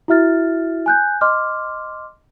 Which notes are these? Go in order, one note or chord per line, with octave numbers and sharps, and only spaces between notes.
E4 F#4 E5 F6 A6
G#5 F#6 G6
D#5 C6 D6 F6